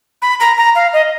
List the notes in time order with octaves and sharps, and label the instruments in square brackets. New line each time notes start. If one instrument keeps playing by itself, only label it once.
[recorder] B5
A#5
A#5
F5
D#5